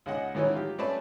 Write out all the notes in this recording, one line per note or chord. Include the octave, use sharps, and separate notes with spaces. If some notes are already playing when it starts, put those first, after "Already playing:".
C#2 C#3 D#5 F#5
A2 D#3 E3 F#3 G#3 C#4
F4 G4
A3 C4 C#4 B4 D5 A5